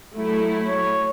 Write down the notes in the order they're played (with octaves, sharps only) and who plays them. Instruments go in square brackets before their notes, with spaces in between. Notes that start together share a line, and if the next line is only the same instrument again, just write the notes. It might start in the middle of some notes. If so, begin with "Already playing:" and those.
[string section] F#3 A3 E4
[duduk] C#5